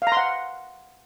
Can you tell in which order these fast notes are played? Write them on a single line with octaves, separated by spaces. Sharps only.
F5 A#5 C6 F#5